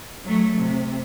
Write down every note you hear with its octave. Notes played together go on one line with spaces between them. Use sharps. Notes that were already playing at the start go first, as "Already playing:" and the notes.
F#3 A3
C3